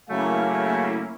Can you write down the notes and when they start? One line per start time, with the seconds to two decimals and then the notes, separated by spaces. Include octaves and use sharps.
0.10 C#3 F#3 A3 A#3 C#4 E4 F5 G#5